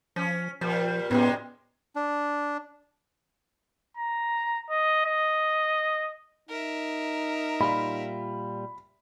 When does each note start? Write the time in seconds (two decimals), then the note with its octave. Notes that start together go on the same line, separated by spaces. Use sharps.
0.16 F3 C#4
0.61 A#2 F3 G3
1.11 F2 A2 G3 G#3 B3
1.96 D4
3.97 A#5
4.70 D#5
5.06 D#5
6.50 D#4 A#4 E5
7.61 A#2 G3 F4 B5